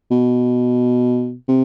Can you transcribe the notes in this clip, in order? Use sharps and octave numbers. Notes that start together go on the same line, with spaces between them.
B2
C3